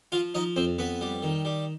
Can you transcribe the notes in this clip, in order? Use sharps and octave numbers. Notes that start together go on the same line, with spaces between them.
F3 F4 F5
F3 D#4 D#5
F2 C4 C5
F2 B3 B4
G3
D#3
G3